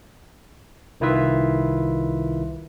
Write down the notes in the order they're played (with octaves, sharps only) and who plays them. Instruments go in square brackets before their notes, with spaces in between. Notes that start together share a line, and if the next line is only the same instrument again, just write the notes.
[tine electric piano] C2 D#3 E4 F4 B4 E5